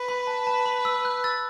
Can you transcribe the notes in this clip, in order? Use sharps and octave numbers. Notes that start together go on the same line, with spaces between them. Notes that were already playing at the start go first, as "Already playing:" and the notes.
Already playing: B4
B5
A5
A5
B5
E6
F#6
E6 A6